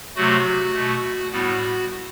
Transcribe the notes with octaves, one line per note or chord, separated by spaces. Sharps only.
C3 F#3 A3 F#4
B2 A3
A2 G3 B3 F#4